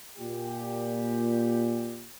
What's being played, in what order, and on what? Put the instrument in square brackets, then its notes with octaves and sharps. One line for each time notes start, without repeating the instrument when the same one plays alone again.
[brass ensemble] A#2 G4